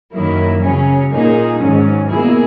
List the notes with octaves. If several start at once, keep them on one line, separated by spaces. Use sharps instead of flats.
F#2 D#3 F#3 A#3 E4
C#3 F#3 C#4
A#2 A#3 D#4 G#4
G#2 D#3 F#3 C#4
B2 A#3 E4 G#4